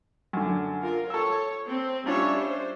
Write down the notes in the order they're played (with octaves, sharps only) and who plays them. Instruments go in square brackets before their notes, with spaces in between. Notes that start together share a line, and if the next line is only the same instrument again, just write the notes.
[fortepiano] F#2 D3
[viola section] F4 A#4
[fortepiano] A4 E6 [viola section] C#5
[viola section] C4
[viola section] G3 C#5 E5 [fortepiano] C#4 D4 F4
[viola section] C5